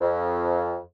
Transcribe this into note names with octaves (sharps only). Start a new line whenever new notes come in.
F2